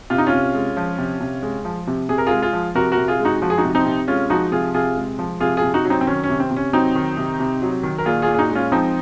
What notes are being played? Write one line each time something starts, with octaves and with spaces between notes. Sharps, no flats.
C3 F4
D#4
C#4 F4
C3
G#3
F3
C3
C3
G#3
F3
C3
C3 G#4
A#4
G#3 F4 G#4
F4 G#4
F3
C3 F#4 A#4
F#4 A#4
C3
F4 G#4
G#3
D#4 F#4
F3 F#4
G#4
D#4 F#4
C3
C4 D#4
C3
G#3 C#4 F4
F3 D#4 F#4
C3 F4 G#4
C3 F4 G#4
G#3
F3
C3 F4 G#4
F4 G#4
C3
D#4 F#4
F#3
C4 D#4
C4
D#3 C#4
C#4
C3
C4
C3
C#4
F#3 C4 D#4
D#3
C3
C3
F#3
D#3
A#4
A#2 F4 G#4
F4 G#4
A#2
G#4
D#4 F#4
G#3
C#4 F4
F3 C4 D#4